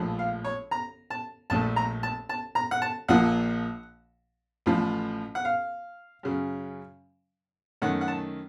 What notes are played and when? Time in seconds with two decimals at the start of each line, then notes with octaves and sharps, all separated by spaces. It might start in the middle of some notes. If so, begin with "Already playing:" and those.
Already playing: A#1 A2 F3
0.19 F5
0.45 C#5
0.71 A#5
1.10 A5
1.50 A#1 A#2 A3 A5
1.76 A#5
2.03 A5
2.29 A5
2.55 A#5
2.71 F#5
2.82 A5
3.08 A#1 A#2 F3 A#3 F#5
4.66 A1 A2 F3
5.35 F#5
5.45 F5
6.23 F#2 C#3 F#3
7.82 F#2 D#3 A3 F#5
8.01 F#5
8.08 A5